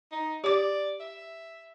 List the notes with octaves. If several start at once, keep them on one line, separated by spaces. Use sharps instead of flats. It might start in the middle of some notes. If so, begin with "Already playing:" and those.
D#4
G4 D5 D6
E5